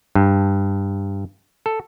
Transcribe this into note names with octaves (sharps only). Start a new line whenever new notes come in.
G2
A4